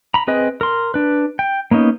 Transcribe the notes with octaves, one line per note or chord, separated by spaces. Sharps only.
A#5 B5
C4 G#4 B4 D#5
A#4 C6
D4 B4
G5
A#3 B3 C#4 D#4